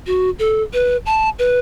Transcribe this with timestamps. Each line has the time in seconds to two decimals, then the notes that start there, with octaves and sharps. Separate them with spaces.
0.07 F#4
0.39 A4
0.74 B4
1.06 A5
1.39 B4